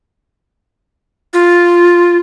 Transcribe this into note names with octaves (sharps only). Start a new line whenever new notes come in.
F4